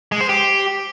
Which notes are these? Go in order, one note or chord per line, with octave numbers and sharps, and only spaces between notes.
G#3
C5
G4